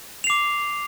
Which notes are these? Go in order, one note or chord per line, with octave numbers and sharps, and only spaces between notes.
D6 C7 F7